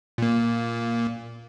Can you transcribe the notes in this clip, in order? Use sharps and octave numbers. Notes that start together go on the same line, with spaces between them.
A#2 A#3